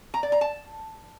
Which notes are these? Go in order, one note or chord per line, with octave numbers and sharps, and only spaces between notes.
A#5
D5
A#5
A5